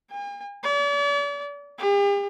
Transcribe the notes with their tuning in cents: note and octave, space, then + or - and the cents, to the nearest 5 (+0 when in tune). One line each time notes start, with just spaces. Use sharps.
G#5 -45
D5 -45
G4 +45